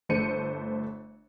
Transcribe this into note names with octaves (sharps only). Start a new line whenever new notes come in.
G1 A3 C5 C#7 D#7